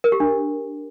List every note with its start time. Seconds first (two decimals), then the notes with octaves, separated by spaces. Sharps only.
0.04 A#4
0.12 G4
0.20 D4